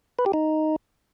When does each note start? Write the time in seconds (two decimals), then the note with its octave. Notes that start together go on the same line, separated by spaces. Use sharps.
0.19 B4
0.26 G4
0.34 D#4